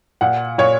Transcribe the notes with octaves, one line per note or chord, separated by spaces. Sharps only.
A#2 F#5
A#2 C#5